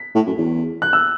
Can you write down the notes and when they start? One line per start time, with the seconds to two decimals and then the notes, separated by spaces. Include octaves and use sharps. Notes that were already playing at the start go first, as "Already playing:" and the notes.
Already playing: B6
0.15 A2
0.27 F#2
0.38 E2
0.82 F#6
0.93 E6